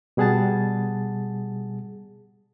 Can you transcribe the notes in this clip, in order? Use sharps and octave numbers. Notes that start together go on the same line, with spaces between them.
B2 G3 G#4 F#5 A5 A6